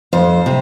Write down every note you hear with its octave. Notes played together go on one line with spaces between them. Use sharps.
F2 C5
C3